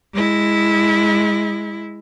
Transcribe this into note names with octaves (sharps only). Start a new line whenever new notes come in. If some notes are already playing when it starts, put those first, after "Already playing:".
G#3 E4